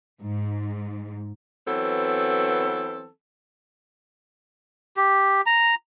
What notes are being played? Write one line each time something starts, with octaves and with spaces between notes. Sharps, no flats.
G#2
E3 F#3 B3 C4 A4
G4
A#5